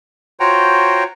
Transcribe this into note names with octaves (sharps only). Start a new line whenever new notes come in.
F4 F#4 C5 C#5 G5 A#5